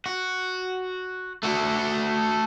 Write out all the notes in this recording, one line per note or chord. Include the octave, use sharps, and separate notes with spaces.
F#4
A3 F#4